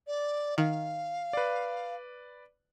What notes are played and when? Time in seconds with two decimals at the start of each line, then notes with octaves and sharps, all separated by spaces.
0.07 D5
0.58 D#3 F5
1.33 B4 D5